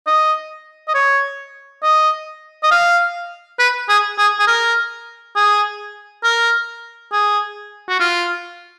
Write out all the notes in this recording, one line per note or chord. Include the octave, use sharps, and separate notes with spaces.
D#5
D#5
C#5
D#5
D#5
F5
B4
G#4
G#4
G#4
A#4
G#4
A#4
G#4
F#4
F4